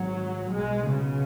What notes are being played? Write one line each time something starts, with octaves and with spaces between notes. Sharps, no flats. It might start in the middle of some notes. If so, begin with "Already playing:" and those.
Already playing: G#1 G#2 F#3
B1 B2 G#3
C#3